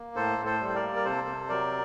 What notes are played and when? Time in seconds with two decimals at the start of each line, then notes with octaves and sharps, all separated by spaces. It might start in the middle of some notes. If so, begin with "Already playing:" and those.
Already playing: A#3
0.16 A2 A4 C5
0.39 A2
0.45 A4 C5
0.61 G3
0.69 C5
0.75 A#4 D5
0.83 A#3
0.96 A#4
1.04 C3 A4 C5
1.28 C3
1.49 F#3 A#4 D5